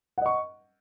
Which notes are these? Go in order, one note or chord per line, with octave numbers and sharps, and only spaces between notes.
D#5 F#5 C#6